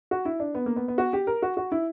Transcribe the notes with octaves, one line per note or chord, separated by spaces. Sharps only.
F#4
E4
D4
B3
A#3
B3
B3
F#4
G4
A#4
F#4
F#4
E4